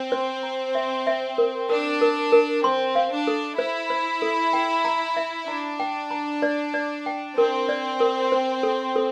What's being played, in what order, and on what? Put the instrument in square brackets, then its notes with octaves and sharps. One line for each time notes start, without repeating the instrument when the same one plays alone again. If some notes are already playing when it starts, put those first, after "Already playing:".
Already playing: [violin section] C4
[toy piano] C5
A#5
E5
E5
A#4
[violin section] D4 [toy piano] A#4
[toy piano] A#4
A#4
[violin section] C4 [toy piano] C6
[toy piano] F5
[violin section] D4
[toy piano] A4
[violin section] E4 [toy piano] C5
[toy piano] C5
A4
G5
A#5
E5
[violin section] D4 [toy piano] A#5
[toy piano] G5
A#5
D5
D5
G5
[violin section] C4 [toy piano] A#4
[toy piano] D5
A#4
C5
A4
A4